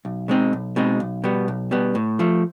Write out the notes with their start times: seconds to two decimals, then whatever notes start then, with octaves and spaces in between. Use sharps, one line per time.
0.05 B1
0.28 B2 G#3 C4 D#4
0.53 B1
0.76 B2 G#3 C4 D#4
1.00 B1
1.24 B2 G3 B3
1.48 B1
1.71 B2 G3 B3
1.95 A2
2.19 F3 A3